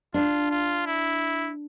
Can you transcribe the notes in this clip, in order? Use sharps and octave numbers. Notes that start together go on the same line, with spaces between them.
D4 F4
F4
E4